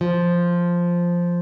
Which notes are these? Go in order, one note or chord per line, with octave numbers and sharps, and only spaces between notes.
F3